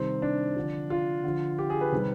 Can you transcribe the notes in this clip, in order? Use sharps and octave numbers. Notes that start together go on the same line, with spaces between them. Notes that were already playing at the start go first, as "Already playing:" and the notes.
Already playing: C3 D#3 G3 C4
D4
D3 F3
F4
D3 F3
G4
G#4
B4
C3 D#3 G3